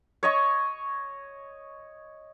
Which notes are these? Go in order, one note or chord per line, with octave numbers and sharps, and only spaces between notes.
C#5 D#5 C#6